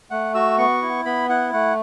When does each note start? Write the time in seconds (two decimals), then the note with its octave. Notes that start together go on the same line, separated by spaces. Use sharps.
0.11 A3 F#5
0.34 F#4 E6
0.58 B3 C#6
0.82 E4
1.05 B3 B5
1.29 E4 F#5
1.53 A3 F#5